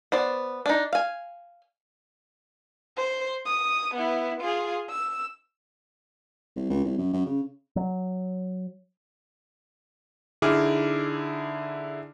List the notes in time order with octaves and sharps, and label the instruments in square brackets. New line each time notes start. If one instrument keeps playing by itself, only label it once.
[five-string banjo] B3 C5 D5
D4 D#4
F5 G#5
[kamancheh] C5
D#6
B3 E4
F4 G#4
E6
[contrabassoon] C2
C#2
C2
F#2
F#2
C#3
[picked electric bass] F#3
[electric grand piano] D3 D#4 E4 G#4 D6 F6